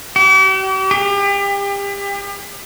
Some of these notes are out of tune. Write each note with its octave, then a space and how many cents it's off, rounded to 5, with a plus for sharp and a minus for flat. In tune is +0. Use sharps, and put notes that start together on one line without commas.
G4 -45
G4 +35